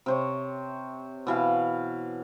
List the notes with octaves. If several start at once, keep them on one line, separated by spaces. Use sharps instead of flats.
C3 C5 C#5
B2 E3 F5